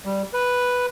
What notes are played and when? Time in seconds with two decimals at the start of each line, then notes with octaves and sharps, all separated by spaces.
0.05 G3
0.33 B4